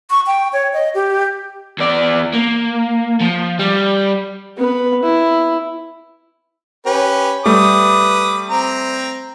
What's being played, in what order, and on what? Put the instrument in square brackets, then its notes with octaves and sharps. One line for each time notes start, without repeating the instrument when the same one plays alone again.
[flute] C#6
G5
C#5
D#5
G4
[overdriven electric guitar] E2 D5
A#3
F3
G3
[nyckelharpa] B3 B4
E4
[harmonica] C#4 G4 B4
[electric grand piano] G3 A3 [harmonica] B4 D6 D#6
[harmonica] C4 A#5